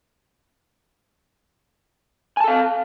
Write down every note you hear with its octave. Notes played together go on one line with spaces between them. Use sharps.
A4 F5 G#5 A5